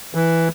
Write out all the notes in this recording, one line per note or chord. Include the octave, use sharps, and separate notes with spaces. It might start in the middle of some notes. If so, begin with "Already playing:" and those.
E3